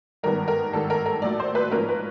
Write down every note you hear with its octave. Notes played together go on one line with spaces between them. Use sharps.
G#1 G2 D#3 G3 B3 A#4
A#4
G#1 G2 D#3 G3 A4
A#4
A#4
A#1 A2 F#3 A3 D5
C5
B4
G#2 F3 A#3 C#4 A#4
B4